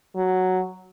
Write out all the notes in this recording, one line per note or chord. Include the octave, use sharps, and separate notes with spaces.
F#3